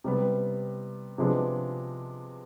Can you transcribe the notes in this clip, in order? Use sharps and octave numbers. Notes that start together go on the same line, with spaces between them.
C3 G3 B3
C3 F3 G#3 B3 D4